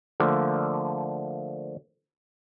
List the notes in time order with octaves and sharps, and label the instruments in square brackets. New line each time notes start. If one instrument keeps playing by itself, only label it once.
[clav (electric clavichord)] D3 F3 A3 A#3